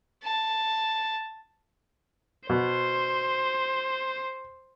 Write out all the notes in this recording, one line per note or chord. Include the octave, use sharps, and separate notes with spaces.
A5
B2 C5